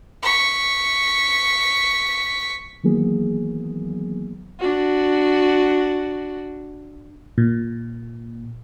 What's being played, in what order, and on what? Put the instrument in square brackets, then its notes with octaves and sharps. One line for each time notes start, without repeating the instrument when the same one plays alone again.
[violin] C#6 B6
[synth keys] D#3 E3 F#3 A#3 B3 G#4
[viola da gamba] D4 F#4
[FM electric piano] A#2